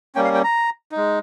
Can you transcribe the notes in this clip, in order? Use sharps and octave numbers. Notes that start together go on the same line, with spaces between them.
G3 A#3 C#4 G5
F5
G5
A#5
G#3 D#4